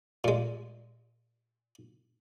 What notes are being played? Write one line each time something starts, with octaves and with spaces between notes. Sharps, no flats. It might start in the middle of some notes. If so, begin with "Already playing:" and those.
A#2 G#3